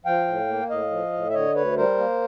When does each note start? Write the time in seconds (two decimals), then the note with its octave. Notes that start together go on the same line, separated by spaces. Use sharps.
0.05 F3 F5 G5
0.27 A2
0.48 A#3
0.69 A2 D#5 F5
0.91 F3
1.12 A2
1.30 E5
1.34 D3 C#5 D#5
1.55 D2 B4 C#5
1.77 G3 A#4 C5
1.98 A#3